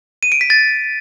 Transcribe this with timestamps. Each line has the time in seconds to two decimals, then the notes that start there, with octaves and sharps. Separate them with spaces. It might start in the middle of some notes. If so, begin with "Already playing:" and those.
0.23 D#7
0.32 D7
0.41 B6
0.50 A6